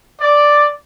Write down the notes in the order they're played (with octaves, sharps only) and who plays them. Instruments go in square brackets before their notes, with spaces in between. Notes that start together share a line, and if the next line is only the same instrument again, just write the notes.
[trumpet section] D5